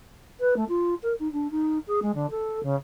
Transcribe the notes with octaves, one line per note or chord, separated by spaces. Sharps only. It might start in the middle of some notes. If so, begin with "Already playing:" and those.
B4
A3
F4
A#4
D#4
D4
D#4
G#4
G#3
D3
A4
C#3